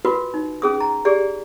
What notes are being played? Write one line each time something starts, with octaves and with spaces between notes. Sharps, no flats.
F4 F#4 A#4 B4
D#4
C#4 G#4 D#6
A#5
G4 G#4 D5